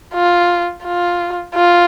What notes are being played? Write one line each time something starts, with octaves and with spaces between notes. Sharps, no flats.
F4
F4
F4